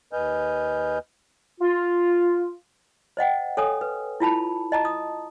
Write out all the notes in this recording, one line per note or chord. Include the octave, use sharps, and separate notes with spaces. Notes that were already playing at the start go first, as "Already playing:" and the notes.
D#2 B4 D#5 G#5 F6 G6
F4
C5 D#5 F#5 G5
A4 C#5 G#5 D#6
B4
E4 F4 A5 B5
D#5 A5 A#5
D#6